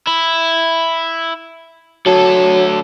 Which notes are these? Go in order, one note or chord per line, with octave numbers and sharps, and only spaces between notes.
E4
D2 F#3 A4